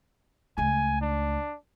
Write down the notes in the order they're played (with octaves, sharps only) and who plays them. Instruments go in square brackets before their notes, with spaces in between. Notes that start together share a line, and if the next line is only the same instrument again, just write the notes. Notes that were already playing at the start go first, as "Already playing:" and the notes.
[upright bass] C#2 A3 [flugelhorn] G#5
[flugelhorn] D4